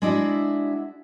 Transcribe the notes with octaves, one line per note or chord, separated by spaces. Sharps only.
G#3 D4 E4 F#4 E5